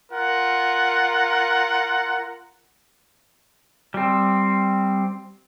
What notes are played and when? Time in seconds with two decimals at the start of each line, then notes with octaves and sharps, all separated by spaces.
0.12 F4 A#4 F#5
3.94 G3 C4